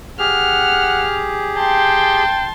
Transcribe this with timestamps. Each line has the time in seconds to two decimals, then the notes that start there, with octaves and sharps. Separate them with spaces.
0.19 G4 G#4 F#5 F6
1.56 G5 A5 C6